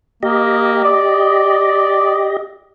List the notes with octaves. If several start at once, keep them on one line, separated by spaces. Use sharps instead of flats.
A#3 G4 D#5
D5